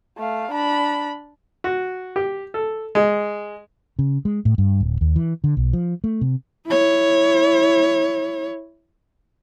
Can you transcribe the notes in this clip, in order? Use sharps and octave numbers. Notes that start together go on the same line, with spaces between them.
A3 F5
D4 B5
F#4
G4
A4
G#3
C#3
G#3
A2
G2
D1
D#2
E3
D3
B1
F3
A3
C3
E4 C#5